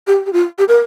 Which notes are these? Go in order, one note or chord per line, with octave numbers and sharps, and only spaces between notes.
G4
G4
F4
G4
A#4